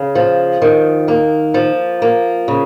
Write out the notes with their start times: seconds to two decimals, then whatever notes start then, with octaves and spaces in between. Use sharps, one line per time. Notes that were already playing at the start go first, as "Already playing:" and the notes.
Already playing: C#3
0.15 F3
0.62 D#3
1.08 A#3
1.54 F3
2.02 A#3
2.48 C#3